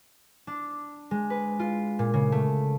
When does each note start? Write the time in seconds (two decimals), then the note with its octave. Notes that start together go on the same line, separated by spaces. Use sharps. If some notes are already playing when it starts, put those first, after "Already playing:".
0.47 D4
1.11 G#3
1.30 B4
1.59 F4
1.99 A#2
2.14 C#3
2.32 A3